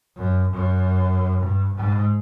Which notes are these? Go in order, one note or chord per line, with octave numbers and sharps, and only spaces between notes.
F#2
F#2
G2
G#2